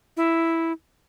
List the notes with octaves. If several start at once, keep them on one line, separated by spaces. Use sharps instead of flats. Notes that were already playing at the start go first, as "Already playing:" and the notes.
E4